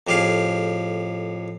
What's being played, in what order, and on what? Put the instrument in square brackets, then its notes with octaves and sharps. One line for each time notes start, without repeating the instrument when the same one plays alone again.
[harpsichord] F2 A2 G4 G#4 F5